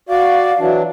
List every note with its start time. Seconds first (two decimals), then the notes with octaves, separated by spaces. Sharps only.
0.09 F#4 D5 F5
0.59 E3 F#3 D4